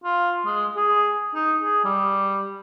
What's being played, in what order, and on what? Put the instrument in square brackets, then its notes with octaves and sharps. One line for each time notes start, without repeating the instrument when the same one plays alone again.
[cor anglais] F4
G#3
G#4
D#4
G#4
G3